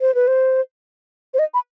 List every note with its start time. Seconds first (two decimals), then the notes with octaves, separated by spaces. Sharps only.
0.01 C5
0.15 B4
0.28 C5
1.34 C5
1.39 D#5
1.54 B5